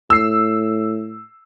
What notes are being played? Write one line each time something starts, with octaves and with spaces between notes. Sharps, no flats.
A2 E6 C7